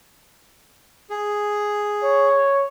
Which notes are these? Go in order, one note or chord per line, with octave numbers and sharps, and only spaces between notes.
G#4
C#5